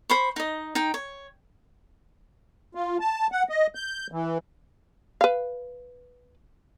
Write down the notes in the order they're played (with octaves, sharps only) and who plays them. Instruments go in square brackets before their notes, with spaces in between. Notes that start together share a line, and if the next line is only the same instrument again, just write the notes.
[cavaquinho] C5 B5 C#6
D#4 D#5
D#4 G5
C#5
[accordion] F4
A5
F#5
D#5
G6
E3
[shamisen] B4 F5